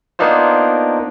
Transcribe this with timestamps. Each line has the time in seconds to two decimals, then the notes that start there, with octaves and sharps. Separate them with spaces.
0.19 A#3 B3 D4 D#4 F4 C5